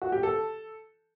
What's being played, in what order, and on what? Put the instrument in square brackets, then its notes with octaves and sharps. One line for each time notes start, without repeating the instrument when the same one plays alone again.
[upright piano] F#4
G4
A4